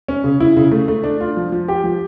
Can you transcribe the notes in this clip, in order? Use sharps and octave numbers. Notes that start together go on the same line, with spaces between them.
C#4
C#3
E4
C#3
A3
A3
D4
F4
F3
F3
G4
F3